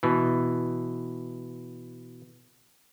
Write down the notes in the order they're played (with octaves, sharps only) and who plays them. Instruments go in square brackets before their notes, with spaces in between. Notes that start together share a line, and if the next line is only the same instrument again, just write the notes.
[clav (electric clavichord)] B2 E3